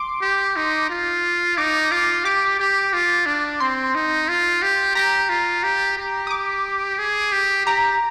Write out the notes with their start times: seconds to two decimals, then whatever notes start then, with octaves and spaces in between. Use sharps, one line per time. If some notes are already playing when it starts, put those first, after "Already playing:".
Already playing: C6 D6
0.22 G4
0.56 D#4
0.89 F4
1.58 D#4 D6
1.91 F4 D6
2.25 G4 D6
2.59 G4
2.93 F4
3.26 D4
3.60 C4 C6
3.95 D#4
4.29 F4
4.62 G4
4.95 G4 A#5
5.30 F4
5.63 G4
5.97 G4
6.27 D#6
6.31 D6
6.99 G#4
7.33 G4
7.66 G4 A#5